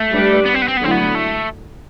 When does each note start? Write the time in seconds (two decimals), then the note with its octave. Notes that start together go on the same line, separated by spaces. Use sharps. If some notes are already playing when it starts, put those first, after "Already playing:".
Already playing: A3
0.12 G3 D4 G4 B4 D5
0.45 B3
0.54 C4
0.62 B3
0.68 C4
0.77 B3
0.80 D3 F#3 A3 C4 E4
0.91 B3
1.15 A3